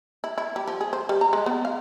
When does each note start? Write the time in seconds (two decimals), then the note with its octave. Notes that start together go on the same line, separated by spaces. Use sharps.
0.24 E4
0.38 E4
0.56 G3
0.68 F3
0.81 G#4
0.93 C5
1.09 G3
1.21 A#5
1.33 G#3
1.46 B3
1.65 F5